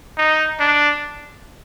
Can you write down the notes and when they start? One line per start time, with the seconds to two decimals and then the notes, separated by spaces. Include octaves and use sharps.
0.17 D#4
0.60 D4